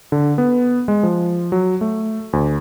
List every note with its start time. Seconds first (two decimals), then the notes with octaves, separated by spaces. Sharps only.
0.12 D3
0.38 B3
0.88 G#3
1.03 F3
1.52 F#3
1.81 A3
2.33 D2